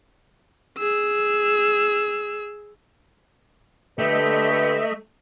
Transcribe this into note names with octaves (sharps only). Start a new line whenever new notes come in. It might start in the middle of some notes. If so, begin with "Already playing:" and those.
G#4 E6
D3 A3 G4 B4 D#5 E5